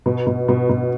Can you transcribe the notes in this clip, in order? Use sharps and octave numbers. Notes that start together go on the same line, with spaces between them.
B2
B2
B2
B2